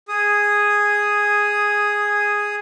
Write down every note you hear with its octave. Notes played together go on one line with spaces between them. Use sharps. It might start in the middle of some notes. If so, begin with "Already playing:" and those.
G#4 D#6